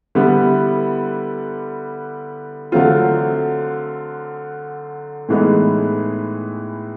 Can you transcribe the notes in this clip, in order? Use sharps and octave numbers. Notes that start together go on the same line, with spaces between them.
D3 G3 B3 E4
D3 F#3 A3 C4 F4
A2 E3 G#3 B3 D#4